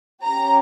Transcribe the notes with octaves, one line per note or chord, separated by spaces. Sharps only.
C#4 G4 A#5